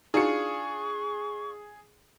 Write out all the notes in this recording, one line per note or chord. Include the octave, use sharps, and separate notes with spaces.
D4 D#4 F4 F#4 G#4 C#6 C#7